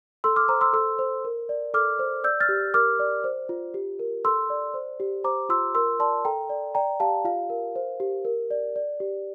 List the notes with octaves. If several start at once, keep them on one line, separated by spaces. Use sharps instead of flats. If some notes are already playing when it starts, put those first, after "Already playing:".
A4 C6 E6
D6 F6
C5 A#5 D6
C6 E6
A4 C6 E6
C5
A#4
D5
A4 D6 F6
C5
D5 E6 G6
F6 A6
G4
A#4 D6 F6
D5
C5
F4
G4
A#4
A4 C6 E6
D5
C5
G4
C5 A#5 D6
F4 C6 E6
A#4 C6 E6
D5 A5 C6
A4 G5 A#5
D5
D5 G5 A#5
G4 F5 A5
F4 F5
A#4
C5
G4
A#4
D5
D5
G4